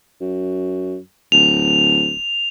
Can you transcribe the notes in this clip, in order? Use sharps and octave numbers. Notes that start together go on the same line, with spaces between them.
F#2
D1 F7